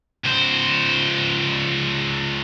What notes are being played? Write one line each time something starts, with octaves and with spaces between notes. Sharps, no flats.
C#2 C5